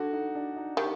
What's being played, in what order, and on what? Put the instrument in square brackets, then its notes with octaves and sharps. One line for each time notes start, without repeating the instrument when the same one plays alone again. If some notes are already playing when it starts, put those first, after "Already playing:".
Already playing: [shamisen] D3 [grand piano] F#4
[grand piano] D#4
D4
D#4
[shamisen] D#3 [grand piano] G4